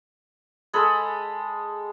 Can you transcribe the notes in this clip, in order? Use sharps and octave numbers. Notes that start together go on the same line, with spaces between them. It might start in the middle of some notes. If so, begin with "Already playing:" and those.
G#3 G#4 A4 B5